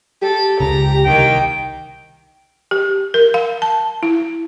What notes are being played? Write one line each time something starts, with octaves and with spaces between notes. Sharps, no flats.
G4 A4
C#2 C#3 A#5
C2 D#3 A#3 G5
G4
A#4
F5
A5
E4